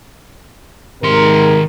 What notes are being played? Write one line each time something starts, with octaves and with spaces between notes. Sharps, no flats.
G#2 C3 D#3 A#4 C6